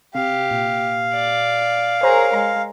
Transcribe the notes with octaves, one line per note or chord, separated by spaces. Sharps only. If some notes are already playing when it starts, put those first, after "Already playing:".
C3 G4 F5
A#2
D5
G#4 A#4 C5 C#5 A#5
G#3 A#5